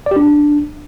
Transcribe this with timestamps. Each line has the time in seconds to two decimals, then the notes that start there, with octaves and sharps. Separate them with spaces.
0.06 D5
0.11 G4
0.16 D4